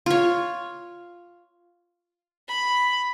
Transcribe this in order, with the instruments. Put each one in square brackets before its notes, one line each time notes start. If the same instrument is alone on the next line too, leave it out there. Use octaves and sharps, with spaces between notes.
[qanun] F4 C#5
[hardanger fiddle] B5